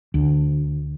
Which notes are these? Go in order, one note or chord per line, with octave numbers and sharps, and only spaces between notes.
D2